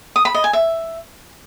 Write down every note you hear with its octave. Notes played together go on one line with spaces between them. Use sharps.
D#6
B5
D#5
G#5
E5